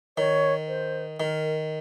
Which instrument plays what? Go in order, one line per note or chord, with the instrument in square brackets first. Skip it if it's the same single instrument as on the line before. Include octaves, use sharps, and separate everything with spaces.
[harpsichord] D#3 [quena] C#5
[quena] C5
[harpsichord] D#3 [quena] A#4